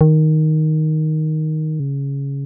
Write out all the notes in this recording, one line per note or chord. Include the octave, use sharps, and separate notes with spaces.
D#3
C#3